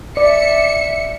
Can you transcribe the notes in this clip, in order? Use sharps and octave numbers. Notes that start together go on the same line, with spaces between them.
D5 E5 C#7